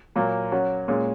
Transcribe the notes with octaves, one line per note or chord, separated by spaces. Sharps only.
A#2 F#3 A#3
F#3 C#4 F#4
A#2 G#3 C#4